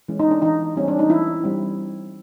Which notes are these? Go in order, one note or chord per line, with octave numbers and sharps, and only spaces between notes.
E3 G#3 C#4
D#4
D4
E3 D#4
G3 C4 C#4
D4
D#4
E3 E4
G3 C4